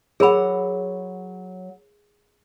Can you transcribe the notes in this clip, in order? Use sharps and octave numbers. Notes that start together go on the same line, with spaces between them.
F#3 G#4 A#4 F#5 B5